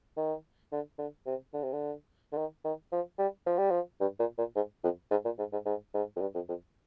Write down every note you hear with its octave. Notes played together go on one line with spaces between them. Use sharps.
D#3
D3
D3
C3
D3
C3
D3
D3
D#3
D#3
F3
G3
F3
G3
F3
G2
A#2
A#2
G#2
F2
G#2
A#2
G#2
G#2
G#2
G#2
F2
G2
F2
F2